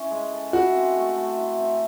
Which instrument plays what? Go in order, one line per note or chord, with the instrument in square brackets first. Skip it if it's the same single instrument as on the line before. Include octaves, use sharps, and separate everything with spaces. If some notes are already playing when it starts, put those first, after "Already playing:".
Already playing: [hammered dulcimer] C#4 E4
G#3
A4
[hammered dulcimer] E4 [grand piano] F#4
[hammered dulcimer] C4
A3
A3
E4
C4